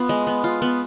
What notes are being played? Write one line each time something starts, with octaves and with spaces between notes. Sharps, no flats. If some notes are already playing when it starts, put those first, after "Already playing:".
Already playing: B3 F4
G#3
B3
F4
B3